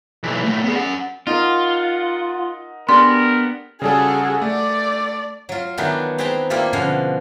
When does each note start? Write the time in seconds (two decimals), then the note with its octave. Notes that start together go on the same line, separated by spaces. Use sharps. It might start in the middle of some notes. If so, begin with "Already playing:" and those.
0.23 B1 E3
0.44 A#2 A3
0.64 B3 G#4
0.76 C#4 F#5
1.27 D#4 F4 A#4 F#5
2.89 B3 D4 G4 G#4 A#4 C6
3.82 C#3 G3 F#4 G#4 A4
4.42 A3 D5
5.49 F#3 F4
5.77 D#3 E3 F#3 B3 D4 D#4
6.18 C4 G#4 B4 G5 A5 A#5
6.50 G3 A#3 E4 F4 G4 A4
6.73 B2 D3 F3 C#4 F5